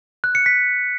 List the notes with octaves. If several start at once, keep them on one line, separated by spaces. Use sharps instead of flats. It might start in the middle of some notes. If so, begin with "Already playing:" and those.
F#6
C#7
B6